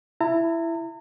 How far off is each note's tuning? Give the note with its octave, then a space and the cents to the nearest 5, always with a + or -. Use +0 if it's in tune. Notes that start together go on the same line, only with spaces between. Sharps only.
E4 +10 A#5 -40